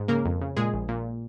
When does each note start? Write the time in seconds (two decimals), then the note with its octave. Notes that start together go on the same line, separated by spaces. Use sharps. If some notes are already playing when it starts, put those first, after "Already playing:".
Already playing: G#2
0.08 C#3 A#3 A#4
0.25 F2
0.41 C#3
0.57 A#2 G#3 G#4
0.73 A#1
0.89 A#2